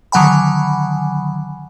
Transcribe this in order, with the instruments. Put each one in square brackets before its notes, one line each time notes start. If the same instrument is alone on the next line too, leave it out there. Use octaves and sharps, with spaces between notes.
[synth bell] D3 D#3 F#3 F#5 G#5 B5